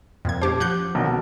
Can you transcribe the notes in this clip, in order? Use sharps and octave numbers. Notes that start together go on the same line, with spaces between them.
F2 A#2 G#6
C#4 G4 C5 A5 D6
F3 F#5 G6
B1 D3 D#3
B2